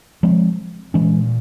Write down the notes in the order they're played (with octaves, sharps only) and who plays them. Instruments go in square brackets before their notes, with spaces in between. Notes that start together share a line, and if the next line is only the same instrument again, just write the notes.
[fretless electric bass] F3 G#3 C4
[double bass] A#2 [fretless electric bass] E3 G#3 C#4